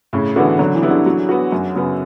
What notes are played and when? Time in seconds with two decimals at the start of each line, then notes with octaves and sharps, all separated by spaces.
0.13 A2 C#3
0.36 D3 E3 B3 F#4
0.59 D3 F#3
0.75 E3
0.82 G3 B3 E4
0.90 D3
1.06 F#3
1.29 B3 F#4
1.52 F#2
1.75 C#3 F#3 B3